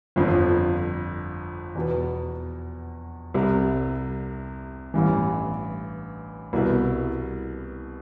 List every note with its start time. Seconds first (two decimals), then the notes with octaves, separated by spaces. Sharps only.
0.16 G1 F2 D3 F3
1.75 E2 B2 B3
3.34 C2 C3 G3
4.94 A1 G2 E3
6.53 C2 B2 B3 E4